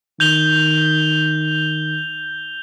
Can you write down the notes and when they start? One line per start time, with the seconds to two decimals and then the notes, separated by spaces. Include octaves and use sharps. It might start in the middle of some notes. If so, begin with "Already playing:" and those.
0.20 D#3 G6 F7 G7